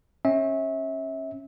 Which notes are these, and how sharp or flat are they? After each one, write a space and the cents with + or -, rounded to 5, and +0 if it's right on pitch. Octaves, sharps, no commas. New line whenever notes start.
C#4 -25 E5 -25